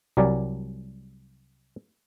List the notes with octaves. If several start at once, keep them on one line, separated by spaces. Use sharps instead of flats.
C2 F#3 G3 A#4 D5 G#5